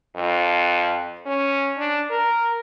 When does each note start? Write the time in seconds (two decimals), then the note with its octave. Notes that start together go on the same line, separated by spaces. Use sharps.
0.16 F2
1.26 C#4
1.78 D4
2.10 A#4